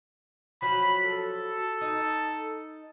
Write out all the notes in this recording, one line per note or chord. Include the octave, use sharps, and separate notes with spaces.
F3 F#3 F#4 B5
A4
D#4